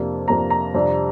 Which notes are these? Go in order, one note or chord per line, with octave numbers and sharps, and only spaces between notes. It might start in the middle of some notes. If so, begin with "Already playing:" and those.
Already playing: F2 C3 A#3 D4
F2 C3 A#3 D4 A#5
A#5
F2 C3 G3 D4